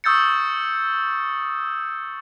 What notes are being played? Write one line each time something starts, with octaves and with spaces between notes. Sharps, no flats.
C#6 D#6 E6 G6 A6 C#7